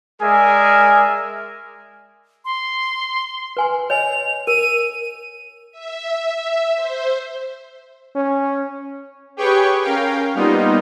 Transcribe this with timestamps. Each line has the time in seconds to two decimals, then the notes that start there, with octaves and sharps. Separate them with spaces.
0.21 G#3 G#4 A#4 D5 E5 G#5
2.45 C6
3.57 B4 G#5 C6
3.90 C#5 D#5 G#5 F7
4.47 A#4 D#7
5.72 E5
6.75 C5
8.16 C#4
9.37 G4 G#4 B4 C#5 G5 C#6
9.82 C#4 A#4 F5 G5
10.35 G3 A#3 B3 D#4 F4